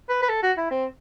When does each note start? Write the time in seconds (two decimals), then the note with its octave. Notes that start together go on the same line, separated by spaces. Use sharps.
0.09 B4
0.22 B4
0.29 A4
0.43 F#4
0.57 E4
0.71 C4